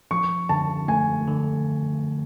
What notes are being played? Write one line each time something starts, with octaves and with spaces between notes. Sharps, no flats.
F3 C#6
D3 A5
A3 G#5
D3